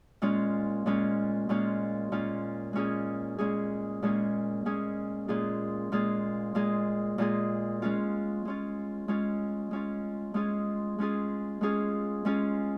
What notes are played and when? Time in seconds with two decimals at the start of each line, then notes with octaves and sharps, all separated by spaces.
0.22 A#2 G#3 C#4 F4
0.86 A#2 G#3 C#4 F4
1.49 A#2 G#3 C#4 F4
2.12 A#2 G#3 C#4 F4
2.73 A#2 G#3 C#4 G#4
3.38 A#2 G#3 C#4 G#4
4.02 A#2 G#3 C#4 G#4
4.65 A#2 G#3 C#4 G#4
5.28 A#2 G#3 F4 G#4
5.92 A#2 G#3 F4 G#4
6.55 A#2 G#3 F4 G#4
7.18 A#2 G#3 F4 G#4
7.82 G#3 C#4 F4
8.45 G#3 C#4 F4
9.08 G#3 C#4 F4
9.71 G#3 C#4 F4
10.34 G#3 C#4 F4 G#4
10.98 G#3 C#4 F4 G#4
11.61 G#3 C#4 F4 G#4
12.25 G#3 C#4 F4 G#4